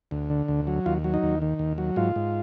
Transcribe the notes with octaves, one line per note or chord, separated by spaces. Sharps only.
D2
D3
D2
F#3
D#2 F4
F#3
D#4
D#2
D#3
D#2
F#3
G#2 F4
G#2